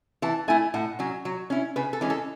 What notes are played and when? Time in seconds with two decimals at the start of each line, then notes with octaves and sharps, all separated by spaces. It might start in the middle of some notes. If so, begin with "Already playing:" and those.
0.22 E3 A5
0.48 A3 E4 G#5
0.74 A2 F#5
0.99 F#3 C#4
1.25 F#3
1.50 C#4 E4
1.76 C#3 B4
1.93 A4
2.01 E3 G#3 C#4
2.10 A4